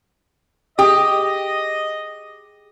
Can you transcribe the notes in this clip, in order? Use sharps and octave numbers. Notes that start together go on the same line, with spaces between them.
G4 G#4 D#5 D#6